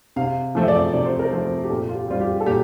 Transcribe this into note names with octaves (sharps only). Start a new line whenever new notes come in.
C3 F5
F3 A3 C4
E5
D5
C3 D5
C5
A#4
F3 A3 C4 C5
G4
A#2 A4
F4
G4
G3 C4 F4
G4
A4
A#2 G4